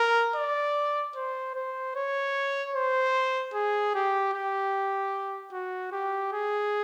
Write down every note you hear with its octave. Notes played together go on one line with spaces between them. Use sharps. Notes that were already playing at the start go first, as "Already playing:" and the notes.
Already playing: A#4
D5
C5
C5
C#5
C5
G#4
G4
G4
F#4
G4
G#4